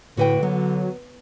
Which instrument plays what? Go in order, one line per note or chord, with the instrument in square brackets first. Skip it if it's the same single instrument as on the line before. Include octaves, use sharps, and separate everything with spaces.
[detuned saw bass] A2 [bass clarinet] D3 [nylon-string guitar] F#4 B4 G5
[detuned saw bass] F#3 [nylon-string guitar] B3